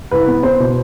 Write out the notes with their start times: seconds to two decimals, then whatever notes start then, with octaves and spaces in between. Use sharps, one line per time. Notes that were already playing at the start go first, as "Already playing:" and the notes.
0.11 C2 B4
0.27 B3
0.43 B3 C5
0.60 B2